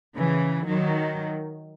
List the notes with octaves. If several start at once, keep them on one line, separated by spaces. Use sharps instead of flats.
C#3 E3
D#3 F#3